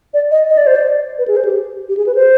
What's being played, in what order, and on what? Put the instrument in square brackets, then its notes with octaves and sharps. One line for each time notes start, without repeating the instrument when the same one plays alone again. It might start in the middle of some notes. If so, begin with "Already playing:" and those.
[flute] D5
D#5
D#5
D5
C5
D5
B4
G#4
C5
G4
G4
G#4
B4
C5